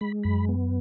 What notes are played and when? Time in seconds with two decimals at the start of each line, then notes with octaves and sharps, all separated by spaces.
0.01 G#3 B5
0.23 F#2 B5
0.49 B3